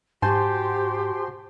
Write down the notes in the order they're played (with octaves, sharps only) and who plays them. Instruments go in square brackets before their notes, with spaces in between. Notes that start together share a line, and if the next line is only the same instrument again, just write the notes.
[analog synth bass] G#2 [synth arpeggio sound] F#4 C5 C6 [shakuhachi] G4 [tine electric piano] G#5 A5 G6